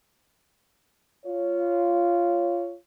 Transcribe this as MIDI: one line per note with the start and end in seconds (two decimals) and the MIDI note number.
1.25 2.74 65
1.25 2.74 73